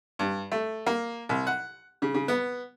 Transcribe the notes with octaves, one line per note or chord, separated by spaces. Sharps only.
G2
A3
A#3
C2
F#5
C#3
C#3
B3